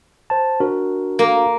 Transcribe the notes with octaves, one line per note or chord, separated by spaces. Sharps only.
C5 A5
D4 F#4 A#4
A#3